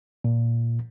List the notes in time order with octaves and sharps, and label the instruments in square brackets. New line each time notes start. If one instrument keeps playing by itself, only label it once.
[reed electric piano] A#2